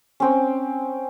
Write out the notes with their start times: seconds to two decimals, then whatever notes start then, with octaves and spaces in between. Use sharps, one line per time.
0.20 C4 C#4